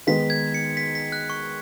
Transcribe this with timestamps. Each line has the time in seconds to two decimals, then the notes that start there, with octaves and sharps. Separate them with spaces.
0.07 D#3 G#3 B3 D#4 B4 B6
0.30 G#6
0.54 C#7
0.77 B6
0.95 B6
1.12 F#6
1.30 C#6